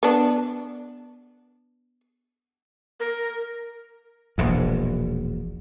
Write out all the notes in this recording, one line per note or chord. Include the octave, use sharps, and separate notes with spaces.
B3 D4
A#4
E1 A#1 E2